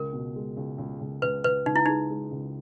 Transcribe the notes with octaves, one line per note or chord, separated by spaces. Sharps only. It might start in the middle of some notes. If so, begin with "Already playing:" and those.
Already playing: C#2 A#4
B2
G#3
C#2
C#2
C#2
C#2 B4
C#2 B4
C#2 D#4
E4
G#3 D#4
G#3
C#2